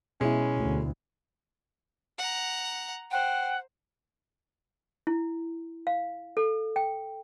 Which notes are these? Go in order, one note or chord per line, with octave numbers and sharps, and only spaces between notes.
B2 G#3 C#4 E4
D2
F#5 A#5
C5 F#5 G5
E4
F5
A4
G5